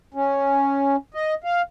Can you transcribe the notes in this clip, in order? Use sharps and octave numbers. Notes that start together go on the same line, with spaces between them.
C#4
D#5
F5